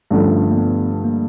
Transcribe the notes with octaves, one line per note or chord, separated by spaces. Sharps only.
G2 D3 F3 A3 C#4
A#3
B3
A#3